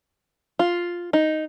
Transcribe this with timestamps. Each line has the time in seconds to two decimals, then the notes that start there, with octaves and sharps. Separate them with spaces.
0.59 F4
1.13 D#4